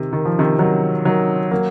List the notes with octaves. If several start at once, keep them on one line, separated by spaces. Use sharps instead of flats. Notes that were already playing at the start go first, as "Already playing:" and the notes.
Already playing: C3 D#3
D#3
F3
C3 D#3
D#3 F#3
D#3 F#3
F#3 A#3